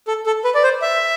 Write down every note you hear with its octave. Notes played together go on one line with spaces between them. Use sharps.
A4
A4
B4
D5
C5
E5